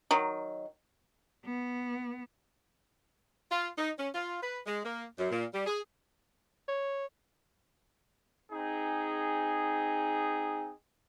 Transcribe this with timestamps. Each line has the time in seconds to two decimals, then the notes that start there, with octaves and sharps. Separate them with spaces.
0.11 D#3 F#3
1.45 B3
3.51 F4
3.78 D#4
3.98 C#4
4.14 F4
4.42 B4
4.66 G#3
4.84 A#3
5.18 F#2
5.31 A#2
5.54 G3
5.67 G#4
6.68 C#5
8.51 C4 D#4 G#4